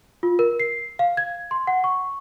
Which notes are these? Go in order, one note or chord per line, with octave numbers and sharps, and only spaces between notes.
F4
A#4
C7
F5
G#6
C6
F#5
C#6